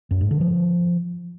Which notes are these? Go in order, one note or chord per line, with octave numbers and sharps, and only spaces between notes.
F#2
G#2
D3
F3